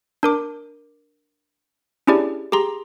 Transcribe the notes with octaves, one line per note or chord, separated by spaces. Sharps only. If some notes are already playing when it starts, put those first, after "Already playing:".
D4 A#4 D6
C#4 D4 E4 G4 G#4 D5
G4 G#4 A#5 C6